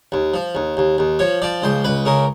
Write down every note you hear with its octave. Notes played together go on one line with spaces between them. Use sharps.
D#2
F3
D#2
D#2
D#2
F3 C#5
F3 D5
C#2 C5
C#2 B4
C#3 A#4